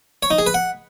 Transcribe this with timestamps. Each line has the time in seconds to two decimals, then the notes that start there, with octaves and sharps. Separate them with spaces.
0.23 C#5
0.31 D#4
0.38 G#4
0.46 B4
0.54 F#5